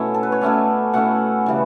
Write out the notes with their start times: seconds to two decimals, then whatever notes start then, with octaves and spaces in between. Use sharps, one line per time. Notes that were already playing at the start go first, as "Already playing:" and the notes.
Already playing: B2 A3 C#4 E4 C#5
0.14 A4
0.23 B4
0.32 C#5
0.41 B2 A3 C#4 E4 D5
0.93 B2 A3 C#4 E4 F#5
1.46 C#3 E3 G3